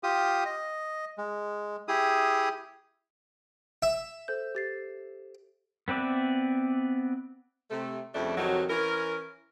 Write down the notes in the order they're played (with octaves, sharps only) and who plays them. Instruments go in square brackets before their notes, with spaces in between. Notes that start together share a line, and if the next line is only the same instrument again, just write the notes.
[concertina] F4 G4 D#6
D#5
G#3
E4 G4 G#4 D#6
[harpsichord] E5
[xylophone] A4 C5 G6
G4 A6 C7
[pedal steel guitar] B3 C4 B4 D5 E5
[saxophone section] C3 A3
F2 C#3 G3 A3 D4
F2 C3 D#3 F#3
E3 C#4 A#4